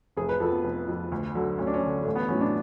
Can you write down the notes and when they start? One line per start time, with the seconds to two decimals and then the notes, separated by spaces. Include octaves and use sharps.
0.17 F1 G#4
0.29 B4
0.40 F2 F3 A4
0.52 B3
0.64 F1
0.88 F2 F3
1.12 D2
1.35 D3 F#3
1.58 D2 C#4
1.67 D4
1.74 C#4
1.83 D3 F#3
2.03 A1 A3
2.16 B3
2.28 A2 F#3 C#4
2.41 D4